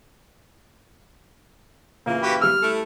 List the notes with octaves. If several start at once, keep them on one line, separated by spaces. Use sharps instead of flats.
A#2 C#3 E3 A#3
F#4 G4 B4
G3 E6 F6
A3 E4 A4